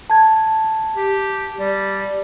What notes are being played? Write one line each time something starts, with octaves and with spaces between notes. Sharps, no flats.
A5 G#6
G4
G3